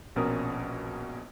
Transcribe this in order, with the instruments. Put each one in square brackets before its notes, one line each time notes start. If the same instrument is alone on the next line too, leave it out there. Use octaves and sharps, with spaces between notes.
[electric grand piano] A#1 B2 C#4 A#4 D#6